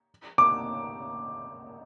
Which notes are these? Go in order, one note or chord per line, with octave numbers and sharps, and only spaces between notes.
D6